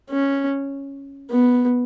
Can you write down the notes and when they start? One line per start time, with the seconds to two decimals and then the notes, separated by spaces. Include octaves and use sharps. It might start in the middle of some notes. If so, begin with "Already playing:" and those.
0.11 C#4
1.30 B3